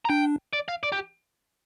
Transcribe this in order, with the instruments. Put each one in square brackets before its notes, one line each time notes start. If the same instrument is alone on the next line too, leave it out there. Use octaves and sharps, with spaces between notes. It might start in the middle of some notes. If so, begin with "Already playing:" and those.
[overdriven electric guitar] A#5
[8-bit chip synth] D4 [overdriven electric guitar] G5
[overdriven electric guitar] D5
F5
D5
G4